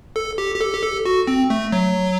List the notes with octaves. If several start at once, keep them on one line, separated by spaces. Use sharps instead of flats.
A4
G4
G4
A4
G4
A4
F#4
C4
A3
F#3